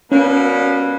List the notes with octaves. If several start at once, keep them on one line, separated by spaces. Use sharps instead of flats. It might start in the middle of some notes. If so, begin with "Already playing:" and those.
B2 G3 A#3 C#4